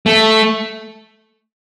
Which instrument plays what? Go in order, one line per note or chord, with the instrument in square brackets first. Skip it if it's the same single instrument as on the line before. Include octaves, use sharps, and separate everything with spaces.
[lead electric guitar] A3